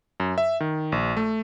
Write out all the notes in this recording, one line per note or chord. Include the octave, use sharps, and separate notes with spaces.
F#2
E5
D#3
A#1
A3